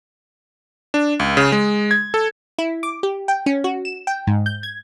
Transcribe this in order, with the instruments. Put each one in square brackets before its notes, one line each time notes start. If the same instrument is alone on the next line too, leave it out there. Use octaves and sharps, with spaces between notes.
[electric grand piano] D4
C#2
C#3
G#3
G#6
A4
[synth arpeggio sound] E4
D6
G4
G5
C#4
F#4
E7
G5
G#2
G6
G#6